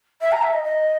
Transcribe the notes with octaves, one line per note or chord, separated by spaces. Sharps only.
E5
A#5
E5
D#5
D#5